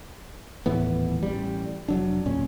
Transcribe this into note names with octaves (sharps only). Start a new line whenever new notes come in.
D#1 A2 E3 B3
A1 G3
F1 F#3 D4
D1 A#2 C#4